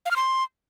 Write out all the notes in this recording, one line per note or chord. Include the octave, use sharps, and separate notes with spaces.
F5
F6
C6